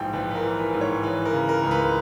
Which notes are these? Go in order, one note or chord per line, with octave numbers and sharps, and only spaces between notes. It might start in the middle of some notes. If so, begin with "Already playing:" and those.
Already playing: A#1 G#2 E3 G5 G#5
A#1 B4
B4
A#4
E3
B4
G#2
C#5
E3 B4
A#4
C#3
A#4
C#2
B4